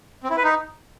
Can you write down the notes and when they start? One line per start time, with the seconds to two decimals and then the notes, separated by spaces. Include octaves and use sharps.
0.24 C4
0.30 E4
0.37 B4
0.43 D#4